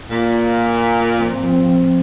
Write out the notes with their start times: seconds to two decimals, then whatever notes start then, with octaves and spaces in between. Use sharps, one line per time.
0.11 A#2
1.19 F3 C4